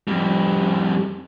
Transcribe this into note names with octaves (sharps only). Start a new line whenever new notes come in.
F2 G3